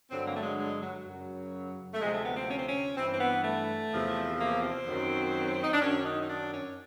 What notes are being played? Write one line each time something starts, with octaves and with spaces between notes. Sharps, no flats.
G2 D3 F#3 C4
A#3
A3
G#3
G#3
F#3
F#2 C#3 F#3
A3
D2 C3 F3 G#3
A3
B3
C4
C#4
C4
C#4
G2 E3 C4
C4
B3
A3
E2 C3 F3
A#3
C4
F#2 D#3 F#3
D#4
D4
F#2 D#3 F#3 C#4
D#4
D#4
D4
C#4